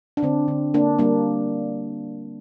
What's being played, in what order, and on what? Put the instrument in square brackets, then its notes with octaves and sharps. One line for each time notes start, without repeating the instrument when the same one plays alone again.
[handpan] D4
D3 C4
D3
A#3 D4
G3 A#3 D4